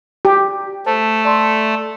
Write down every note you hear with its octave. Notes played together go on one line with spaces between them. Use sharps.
G4
A3 C5 A5
D5 A5 C6